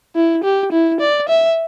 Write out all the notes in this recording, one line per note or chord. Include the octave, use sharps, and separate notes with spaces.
E4
G4
E4
D5
E5